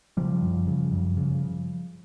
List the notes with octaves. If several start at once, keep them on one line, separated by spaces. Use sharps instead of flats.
C#3 F3 G3
F#2
C#3
F#2
C#3